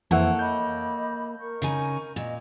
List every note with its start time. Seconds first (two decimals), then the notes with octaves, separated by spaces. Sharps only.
0.11 F2 E3 A#3 A4 C5 C#5 E5 F#5
0.39 D#5 B5 D6 G6
1.40 A#4 C#6
1.62 C#3 D#4 G#5
2.16 A#2 D#5